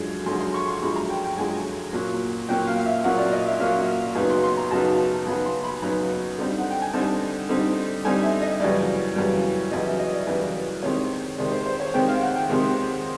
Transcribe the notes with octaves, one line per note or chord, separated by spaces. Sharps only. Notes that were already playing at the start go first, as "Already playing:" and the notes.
Already playing: F#2 D3 F3 G#3
F#2 D3 F3 G#3 C6
C6
C#6
C6
F#2 D3 F3 G#3 B5
A#5
G5
G5
F#2 D3 F3 G#3 G#5
A#2 F#3 A#3 C#4
A#2 F#3 A#3 C#4 G5
F5
F5
E5
A#2 F#3 A#3 C#4 F#5
D5
D#5
E5
A#2 F#3 A#3 C#4 F5
F#2 C#3 F#3 B3 D#4
C6
C6
A#5
F#2 C#3 F#3 B3 D#4 A5
A5
F#2 C#3 F#3 B3 D#4 B5
C6
B5
F#2 C#3 F#3 B3 D#4 A#5
D3 G3 C4 D#4
F#5
G5
G#5
D3 G3 C4 D#4 A5
D3 G3 C4 D#4
D3 G3 C4 D#4 G#5
E5
D#5
F#2 C#3 E3 G3 D5
F#2 C#3 E3 G3
F#2 C#3 E3 G3 D#5
E5
D#5
D5
F#2 C#3 E3 G3 B4
C3 D#3 G#3 C4 C#5
C3 D#3 G#3 C4 D5
C5
C5
C#5
C3 D#3 G#3 C4 G5
F5
F#5
G5
C3 D#3 G#3 C4